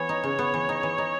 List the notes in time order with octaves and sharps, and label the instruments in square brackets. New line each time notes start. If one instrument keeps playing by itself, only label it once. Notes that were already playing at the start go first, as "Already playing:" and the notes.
Already playing: [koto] E3 B3 [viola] C#5
[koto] D#4
C#3
B3
E3
D#4
E3
D#4